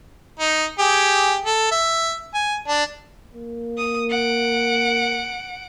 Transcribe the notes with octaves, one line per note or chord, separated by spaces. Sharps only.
D#4
G4 G#4
A4
E5
G#5
D4
A#3
D#6
F#5 D7